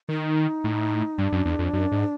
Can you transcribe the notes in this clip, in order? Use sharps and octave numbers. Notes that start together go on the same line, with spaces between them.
D#3 D#4
A2
G2 D4
F#2
E2
F2
F#2
G#2